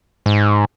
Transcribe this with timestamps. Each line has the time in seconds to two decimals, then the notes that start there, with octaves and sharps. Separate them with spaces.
0.26 G#2